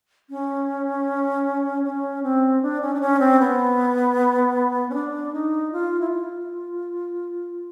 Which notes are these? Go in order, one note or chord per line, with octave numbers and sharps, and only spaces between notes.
C#4
C#4
C4
D4
C#4
D4
C#4
C4
B3
C#4
D4
D#4
F4
E4
F4